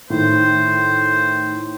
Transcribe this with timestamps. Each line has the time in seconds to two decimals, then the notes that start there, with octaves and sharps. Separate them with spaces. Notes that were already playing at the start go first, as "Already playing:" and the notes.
0.10 A2 D#3 C5